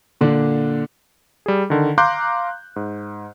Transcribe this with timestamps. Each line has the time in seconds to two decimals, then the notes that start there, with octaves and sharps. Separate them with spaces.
0.21 A#2 D3 D4
1.46 G3 G#4
1.70 D3 D#3
1.98 F5 A#5 C6 D6 F#6 G6
2.76 G#2